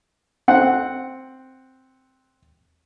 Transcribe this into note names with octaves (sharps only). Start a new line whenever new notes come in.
C4 F#5